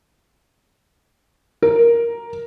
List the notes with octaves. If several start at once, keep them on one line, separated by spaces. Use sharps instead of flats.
A#4